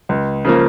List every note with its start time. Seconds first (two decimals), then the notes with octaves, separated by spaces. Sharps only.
0.09 C#2
0.45 C#3 F3 A#3